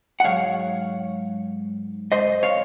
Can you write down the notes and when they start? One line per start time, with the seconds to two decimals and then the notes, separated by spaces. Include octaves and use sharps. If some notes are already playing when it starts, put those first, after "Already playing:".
0.20 F#5
0.24 G#2 F#3 C#5 F5
2.12 C5 D#5
2.43 C#5 F5